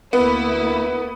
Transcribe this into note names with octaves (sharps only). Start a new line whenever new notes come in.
D2 A#3 B3 E4